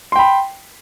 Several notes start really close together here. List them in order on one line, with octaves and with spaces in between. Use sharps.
C6 G5 B5